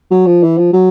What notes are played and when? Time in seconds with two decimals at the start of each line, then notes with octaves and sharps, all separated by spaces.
0.11 F#3
0.26 F3
0.43 E3
0.58 F3
0.73 F#3